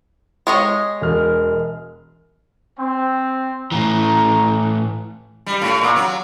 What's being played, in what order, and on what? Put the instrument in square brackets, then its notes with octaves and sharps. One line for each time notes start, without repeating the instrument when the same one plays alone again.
[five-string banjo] G#3 C#5 D#5
[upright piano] E1 F6
[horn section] C4
[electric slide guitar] A2 E3 [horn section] A#5
[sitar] G3
A2
A#2
F#3